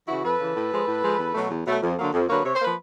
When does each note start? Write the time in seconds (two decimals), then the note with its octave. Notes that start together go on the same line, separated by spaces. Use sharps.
0.08 C#3 E3 E4 F#4
0.24 F2 A4 B4
0.40 C#3 E3
0.56 A2
0.72 F3 G#3
0.87 A2
1.02 F3 G#3
1.18 E2
1.35 B2 F#3 A3
1.51 E2
1.66 B2 F#3 A3
1.82 F2
1.98 D3 F#3 A#3
2.14 F2
2.29 D3 F#3 A#3 B4 C#5
2.44 C3 C#5
2.55 C5
2.61 F3 A#3 B4